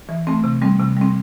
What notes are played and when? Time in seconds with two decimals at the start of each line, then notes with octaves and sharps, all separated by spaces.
0.09 E3
0.27 A3 C4
0.44 C3
0.62 G3 C4
0.80 C3
0.97 G3 C4